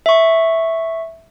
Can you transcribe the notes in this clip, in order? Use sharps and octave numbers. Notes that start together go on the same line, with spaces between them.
E5 C#6